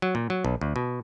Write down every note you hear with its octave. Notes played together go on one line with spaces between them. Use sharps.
F#3
A#2
F#3
B1
D2
B2